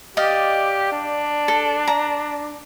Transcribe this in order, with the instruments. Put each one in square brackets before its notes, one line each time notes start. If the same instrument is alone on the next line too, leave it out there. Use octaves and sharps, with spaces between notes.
[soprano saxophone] G4 [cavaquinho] D5 D#5 F5
[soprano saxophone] D4
[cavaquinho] A4
A#5